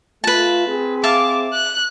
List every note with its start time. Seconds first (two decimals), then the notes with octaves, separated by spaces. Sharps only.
0.24 A3 F4 B4 A5
0.68 C4 G#4
1.04 E5 F5 A5 D6
1.54 F#6